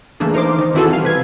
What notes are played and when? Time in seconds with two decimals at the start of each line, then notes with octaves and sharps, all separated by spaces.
0.20 E3 A3 A#3 D4 G#4
0.34 D#4 A#4 C5 D6
0.59 D#3 D#4
0.74 E3 C4 E4 F#4 G#4 A4
0.90 G3 F5
1.03 C3 B4 G#6